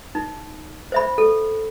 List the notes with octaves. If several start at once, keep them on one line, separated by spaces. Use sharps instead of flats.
D#4
C5 E5 B5
A4